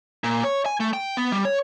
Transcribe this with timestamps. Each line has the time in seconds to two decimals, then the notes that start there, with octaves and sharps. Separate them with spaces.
0.24 A#2
0.44 C#5
0.66 G#5
0.80 A3
0.93 G5
1.17 B3
1.32 G3
1.45 C#5